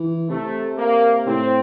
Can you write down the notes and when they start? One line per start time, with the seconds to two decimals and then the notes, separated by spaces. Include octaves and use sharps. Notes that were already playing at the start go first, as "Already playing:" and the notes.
Already playing: E3
0.29 C3 A3
0.77 A#3
1.27 A2 C4